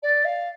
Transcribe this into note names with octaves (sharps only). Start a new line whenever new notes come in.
D5
F5